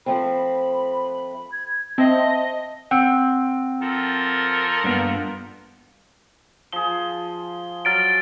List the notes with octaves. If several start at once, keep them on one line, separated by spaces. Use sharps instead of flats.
F3 A3 C4 B5
G#6
C4 D#5 E5 A5
C4 F#5
F3 A4 A#4
G2 A#3 B3
F3 G#4 G7
F#3 F6 A6 D7